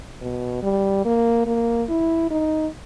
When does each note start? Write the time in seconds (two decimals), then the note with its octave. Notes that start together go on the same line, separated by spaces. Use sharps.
0.22 B2
0.63 G3
1.05 A#3
1.46 A#3
1.89 E4
2.31 D#4